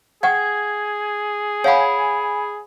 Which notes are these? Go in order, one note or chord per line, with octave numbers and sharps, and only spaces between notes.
G#4 F#5 G5 G#6
C#5 F5 F#5 G#5 B5